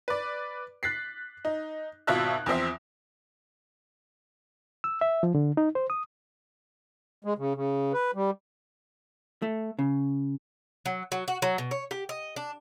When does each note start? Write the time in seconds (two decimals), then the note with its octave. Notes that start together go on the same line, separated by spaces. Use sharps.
0.08 B4 D5
0.83 F#6 A6 B6 C7
1.45 D#4
2.07 G#1 B2 F4 E5 A5 F#6
2.46 E2 F3 C4 E5
4.84 E6
5.01 E5
5.23 F3
5.35 D3
5.57 D#4
5.75 C5
5.90 D#6
7.25 G#3
7.38 C#3
7.55 C#3
7.93 B4
8.15 G3
9.42 A3
9.79 C#3
10.86 F#3
11.12 F#3
11.28 F#4
11.42 F#3
11.58 B2
11.71 C#5
11.91 G4
12.09 D#5
12.36 D4